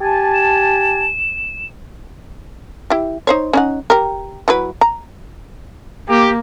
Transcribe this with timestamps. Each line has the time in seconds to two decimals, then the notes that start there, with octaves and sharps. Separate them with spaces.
0.01 G4 G#5 A5
0.34 E7
2.90 E4 G4
3.27 D#4 C5 C#5
3.53 C#4 D#4 F#5
3.90 G4 A#4
4.48 F#3 E4 B4
4.81 A#5
6.08 A#3 G4